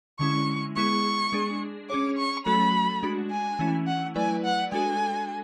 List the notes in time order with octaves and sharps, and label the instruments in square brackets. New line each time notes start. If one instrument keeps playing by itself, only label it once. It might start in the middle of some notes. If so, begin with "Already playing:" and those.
[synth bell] D3 G#3 C#4 E4 [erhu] C#6
[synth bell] G#3 B3 E4 G#4 [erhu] C#6
[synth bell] G#3 D4 G#4
[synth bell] C#4 G#4 C#5 [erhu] D6
[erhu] C#6
[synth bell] F#3 A3 C#4 F#4 A4 [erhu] B5
[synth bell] G#3 D4 F#4
[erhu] G#5
[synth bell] E3 A3 C#4 E4
[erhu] F#5
[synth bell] F#3 A3 E4 B4 D5 [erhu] G#5
[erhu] F#5
[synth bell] G#3 D4 F#4 A4 [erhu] G#5